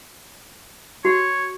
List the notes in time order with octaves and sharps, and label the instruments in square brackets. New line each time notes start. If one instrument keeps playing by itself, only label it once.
[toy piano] F#4 [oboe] C#5